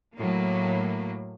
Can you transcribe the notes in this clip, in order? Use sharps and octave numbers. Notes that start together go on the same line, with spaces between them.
A2 F#3 A#3